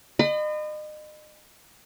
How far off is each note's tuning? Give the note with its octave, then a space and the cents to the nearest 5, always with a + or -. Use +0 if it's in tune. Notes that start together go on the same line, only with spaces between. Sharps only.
D#5 -35 B5 +35